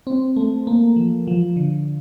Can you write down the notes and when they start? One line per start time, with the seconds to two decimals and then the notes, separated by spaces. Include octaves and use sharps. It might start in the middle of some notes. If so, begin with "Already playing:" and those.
0.07 C4
0.36 A3
0.67 A#3
0.96 F3
1.27 F3
1.56 D3